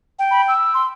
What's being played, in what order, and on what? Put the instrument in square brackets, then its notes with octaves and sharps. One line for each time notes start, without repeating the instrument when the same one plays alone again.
[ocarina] G5
[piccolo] B5
E6
[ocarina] C6